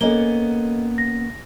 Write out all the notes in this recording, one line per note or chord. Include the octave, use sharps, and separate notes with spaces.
A#3 B3 C#4 A4 D#5 G7
A#6